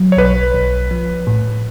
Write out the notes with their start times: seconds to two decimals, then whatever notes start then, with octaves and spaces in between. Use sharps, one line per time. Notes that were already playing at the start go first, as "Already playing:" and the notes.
Already playing: F#3
0.12 C#5
0.17 B1 B4
0.54 B1
0.91 F3
1.27 A2